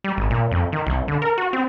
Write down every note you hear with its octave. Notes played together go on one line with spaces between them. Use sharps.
G3
G#1
A#2
F2
D#3
C2
D3
A#4
F#4
C4